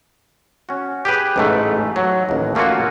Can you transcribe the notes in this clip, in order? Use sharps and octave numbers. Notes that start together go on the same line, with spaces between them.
C#4 F#4
G4 G#4 B4
A1 G#2 A3
F#3
A1 D#2
A3 A#3 C#4 F4 F#4